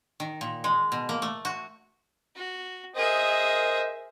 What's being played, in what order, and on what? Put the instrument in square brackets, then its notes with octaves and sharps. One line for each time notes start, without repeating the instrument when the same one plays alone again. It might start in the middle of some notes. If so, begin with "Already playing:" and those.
[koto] D#3
A#2
G#3
B2
A#3
A3
F#4
[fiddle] F#4
[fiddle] G#4 E5 [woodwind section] A#4 C5 D#5